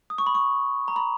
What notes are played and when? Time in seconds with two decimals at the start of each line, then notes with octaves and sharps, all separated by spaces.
0.10 D#6
0.18 C#6
0.27 B5
0.35 C#6
0.88 A#5
0.96 B5